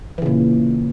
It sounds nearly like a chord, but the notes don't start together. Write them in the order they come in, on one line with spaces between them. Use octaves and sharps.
E3 C#3 A#2